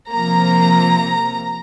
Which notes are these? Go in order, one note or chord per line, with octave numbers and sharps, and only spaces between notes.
C3 F3 A#3 A#5